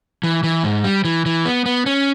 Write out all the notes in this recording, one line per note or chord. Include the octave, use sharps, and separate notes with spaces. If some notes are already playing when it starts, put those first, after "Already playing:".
E3
E3
G#2
G3
E3
E3
B3
B3
C#4